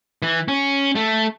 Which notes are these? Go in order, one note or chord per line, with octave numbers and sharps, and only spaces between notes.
E3
C#4
A3